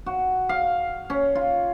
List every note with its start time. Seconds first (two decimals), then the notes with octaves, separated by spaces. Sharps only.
0.06 F#4
0.49 F5
1.10 C#4
1.35 F4